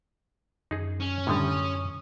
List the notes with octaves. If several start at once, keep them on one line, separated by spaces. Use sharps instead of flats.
F#2 D#4 G#4
C#4
A2 D3 G3 D#6